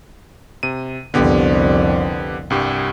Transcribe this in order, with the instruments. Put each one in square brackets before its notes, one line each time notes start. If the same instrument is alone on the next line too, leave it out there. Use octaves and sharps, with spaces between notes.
[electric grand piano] C3 D#7
[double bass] C2 F2 [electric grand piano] D3 B3 G4
[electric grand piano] C2 G2 G4